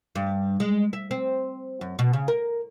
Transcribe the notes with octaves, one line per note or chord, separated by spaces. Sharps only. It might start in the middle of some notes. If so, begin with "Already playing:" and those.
G2
G#3
E5
C4
F#2
B2
C#3
A#4